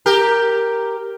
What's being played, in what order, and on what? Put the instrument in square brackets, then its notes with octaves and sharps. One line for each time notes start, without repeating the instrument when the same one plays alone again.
[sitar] G4 A#4